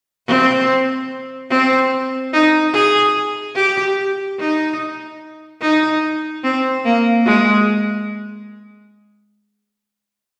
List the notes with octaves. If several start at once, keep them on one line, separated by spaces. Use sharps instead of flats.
C4
C4
D#4
G#4
G4
D#4
D#4
C4
A#3
G#3